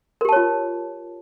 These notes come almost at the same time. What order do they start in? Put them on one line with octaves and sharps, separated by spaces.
A#4 G4 A5 C#5 F4